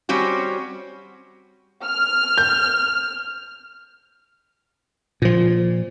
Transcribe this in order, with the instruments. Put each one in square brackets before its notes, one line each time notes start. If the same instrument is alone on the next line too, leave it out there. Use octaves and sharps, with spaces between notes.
[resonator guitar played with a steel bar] G3 C4 C#4 F#4
[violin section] F6
[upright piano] G6
[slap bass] A#2 F3